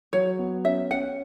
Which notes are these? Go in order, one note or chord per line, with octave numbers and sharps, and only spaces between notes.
F#3 C#5
B3
C#4 E5
C#4 F#5